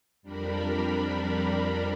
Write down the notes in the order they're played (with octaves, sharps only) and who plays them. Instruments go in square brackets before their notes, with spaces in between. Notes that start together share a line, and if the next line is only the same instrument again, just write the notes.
[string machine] F2 G3 D4 A#4 B5